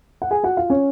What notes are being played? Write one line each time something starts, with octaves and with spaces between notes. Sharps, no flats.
F#5
G#4 G#5
F#4 F#5
F4 F5
C#4 C#5